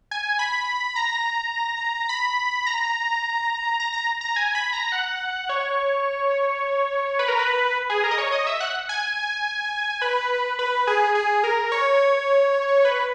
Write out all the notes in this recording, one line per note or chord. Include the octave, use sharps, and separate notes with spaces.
G#5
B5
A#5
B5
A#5
A#5
A#5
A#5
G#5
B5
A#5
F#5
C#5
B4
A#4
B4
G#4
A#4
D#5
C#5
D#5
E5
F#5
G#5
B4
B4
G#4
G#4
A#4
C#5
B4